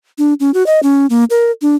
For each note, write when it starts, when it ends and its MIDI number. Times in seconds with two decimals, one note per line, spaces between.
0.18 0.34 62
0.40 0.51 61
0.54 0.66 66
0.66 0.80 75
0.83 1.06 61
1.10 1.24 58
1.30 1.51 70
1.62 1.75 62